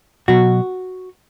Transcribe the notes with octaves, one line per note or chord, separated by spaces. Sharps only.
B2 F#3 F#4